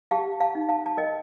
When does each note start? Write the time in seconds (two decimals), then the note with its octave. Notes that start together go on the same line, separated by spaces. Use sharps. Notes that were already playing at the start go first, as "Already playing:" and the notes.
0.11 G4 F5 A5
0.40 F5 A5
0.55 D#4
0.69 F5 A5
0.86 A5
0.97 A#4 D#5 G5